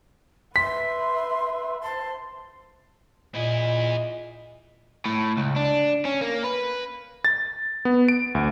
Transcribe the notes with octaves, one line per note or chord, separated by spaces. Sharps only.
B4 E5 C6 B6
C5 A5 C6
A#2 E4 G#4 D#5
A2
C#2
D4
C#4
A#3
B4
A6
B3
D7
D2